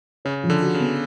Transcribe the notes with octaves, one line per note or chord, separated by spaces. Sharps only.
C#3 C#5
F3
D3
F#4
C#3
B3